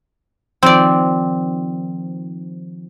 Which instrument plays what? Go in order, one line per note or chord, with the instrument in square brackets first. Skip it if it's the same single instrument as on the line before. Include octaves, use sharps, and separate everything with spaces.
[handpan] D#3 F3 [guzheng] C4 D5